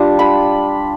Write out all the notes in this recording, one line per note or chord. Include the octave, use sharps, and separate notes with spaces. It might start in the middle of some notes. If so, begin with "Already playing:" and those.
Already playing: G3 D4 F4
B5